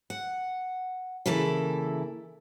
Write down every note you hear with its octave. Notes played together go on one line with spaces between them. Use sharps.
F#5
C#3 E3 A#3 E4 A4